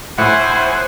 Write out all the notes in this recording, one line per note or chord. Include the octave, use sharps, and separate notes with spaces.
A2 E4 C5 F#5 G#5